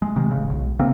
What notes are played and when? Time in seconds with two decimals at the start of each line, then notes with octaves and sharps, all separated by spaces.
0.02 G#3
0.16 C3 D#3 G#3
0.31 D#1 A1 C#3 G#3
0.51 B1
0.79 C#3 A#3 C4